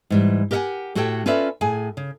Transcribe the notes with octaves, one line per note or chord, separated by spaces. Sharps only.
G#2 E3 G3
G4 A#4 D#5 E5 F#5 G#5
A2 F#4 G4 A4 C#5 G5
C#4 F4 A4 B4 D5 E5
A2 G#4 G#5
C#3